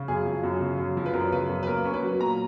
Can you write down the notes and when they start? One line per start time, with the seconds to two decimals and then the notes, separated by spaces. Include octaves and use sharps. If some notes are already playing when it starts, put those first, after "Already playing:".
Already playing: C#3
0.08 F#2 G#4
0.26 F3
0.43 F#2
0.61 C#3
0.79 F#2
0.97 F3
1.06 B4
1.14 F#2 A#4
1.32 C#3 B4
1.49 F#2
1.63 B4
1.67 A#3 A#4
1.85 C#4
1.94 B4
2.03 F#3
2.20 A#2 A#5